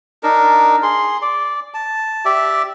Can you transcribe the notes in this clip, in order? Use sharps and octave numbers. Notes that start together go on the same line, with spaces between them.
D4 D#4 A#4
G#4 C6
D5
A5
G4 D5 E5